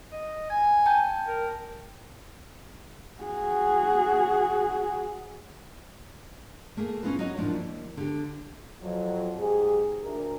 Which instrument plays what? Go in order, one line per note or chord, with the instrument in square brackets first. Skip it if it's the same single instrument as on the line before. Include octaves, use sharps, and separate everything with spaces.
[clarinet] D#5
G#5
[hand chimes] G5 A5 G6
[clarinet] A#4
[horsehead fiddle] F#4 G#4
[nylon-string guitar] A3 A#3 G#4
C#4 D#4 F4 B4
F#3 D#4 F#4 C#5 D#5
F#2 A2 F3 D4
D#2
D3 G4
[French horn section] F2 F#3
G#2 G4 G#4
D2 A#4